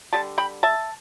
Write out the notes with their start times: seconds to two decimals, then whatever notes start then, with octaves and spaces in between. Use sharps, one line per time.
0.13 D3 G3 A5
0.38 G5 B5
0.63 E5 A5